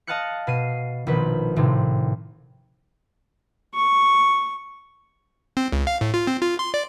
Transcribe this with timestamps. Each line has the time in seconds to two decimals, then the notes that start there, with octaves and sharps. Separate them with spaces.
0.07 D#5 F5 A5 F6 F#6 C#7
0.47 B2 C7 D#7
1.07 A#1 B2 D#3 B4
1.56 G#1 A2 C3
3.74 C#6
5.57 C4
5.72 C#2
5.87 F5
6.01 A2
6.14 F4
6.27 C4
6.42 F4
6.59 C6
6.74 D5